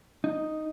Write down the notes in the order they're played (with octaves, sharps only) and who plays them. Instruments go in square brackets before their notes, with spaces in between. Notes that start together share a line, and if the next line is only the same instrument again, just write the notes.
[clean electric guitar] D#4